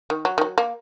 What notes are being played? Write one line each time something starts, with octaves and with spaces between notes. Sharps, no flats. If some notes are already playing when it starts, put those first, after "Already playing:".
D#3
F#3
D#3
F#3
A#3